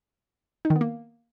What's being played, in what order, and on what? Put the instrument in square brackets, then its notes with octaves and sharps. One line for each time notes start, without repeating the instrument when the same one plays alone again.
[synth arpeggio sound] D#4
D#3
B3
A#3